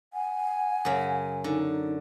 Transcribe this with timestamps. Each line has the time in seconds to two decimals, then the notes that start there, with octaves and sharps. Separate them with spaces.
0.13 F#5 G#5
0.85 F#2 C#3
1.44 D3 D#4